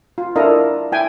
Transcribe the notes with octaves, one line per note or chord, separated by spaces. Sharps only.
F4
D4 E4 F4 A4 A#4 D#5
E4 G5 G#5